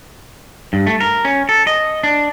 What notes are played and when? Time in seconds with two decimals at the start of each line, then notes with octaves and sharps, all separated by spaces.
0.73 G2
0.87 A3
1.00 A#4
1.25 C#4
1.49 A4
1.67 D#5
2.03 D4